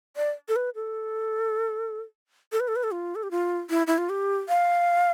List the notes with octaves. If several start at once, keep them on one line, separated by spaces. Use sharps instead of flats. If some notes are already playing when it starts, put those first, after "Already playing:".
D5
A4
B4
A4
A4
B4
A4
B4
A4
F4
A4
G4
F4
E4
E4
F4
G4
F5